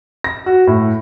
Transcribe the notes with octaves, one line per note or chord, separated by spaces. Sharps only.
A#6
F#4
A2